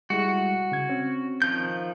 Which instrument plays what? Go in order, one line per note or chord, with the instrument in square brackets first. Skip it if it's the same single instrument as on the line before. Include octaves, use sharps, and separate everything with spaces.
[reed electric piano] G3 G#3 E4 [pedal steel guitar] F#4
[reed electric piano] C#3 G#6
C4 C#4
[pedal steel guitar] D#3 F3 G6